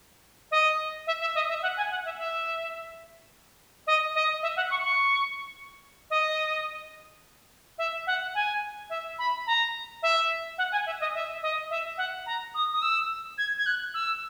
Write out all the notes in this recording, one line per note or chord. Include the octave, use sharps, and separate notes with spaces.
D#5
E5
E5
D#5
E5
F#5
G#5
F#5
E5
E5
D#5
D#5
E5
F#5
C#6
C#6
D#5
E5
F#5
G#5
E5
B5
A#5
E5
F#5
G#5
E5
D#5
E5
D#5
E5
F#5
A#5
D#6
D#6
E6
G#6
G#6
F#6
E6